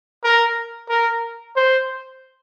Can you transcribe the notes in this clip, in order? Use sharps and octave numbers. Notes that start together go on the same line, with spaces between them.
A#4
A#4
C5